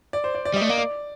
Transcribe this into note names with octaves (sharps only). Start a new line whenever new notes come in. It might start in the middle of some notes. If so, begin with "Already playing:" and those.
D5
C5
D5
D5
G3 D#5
A3
A#3 D5
D5